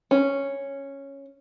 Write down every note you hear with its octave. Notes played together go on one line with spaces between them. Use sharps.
C#4